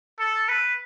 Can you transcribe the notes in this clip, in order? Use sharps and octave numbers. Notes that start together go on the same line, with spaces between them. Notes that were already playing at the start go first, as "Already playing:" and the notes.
A4
B4